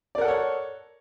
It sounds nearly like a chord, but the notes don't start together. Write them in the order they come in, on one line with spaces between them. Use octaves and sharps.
D5 A#4 F#5 A4 C#5